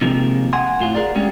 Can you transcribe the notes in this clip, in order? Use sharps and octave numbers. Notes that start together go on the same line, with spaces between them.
C3 D#3 F3 G#3 A#3
F#5 G#5 C6
A2 F4 F#4
G#4 A#4 D5
G3 G#3 C#4 F#4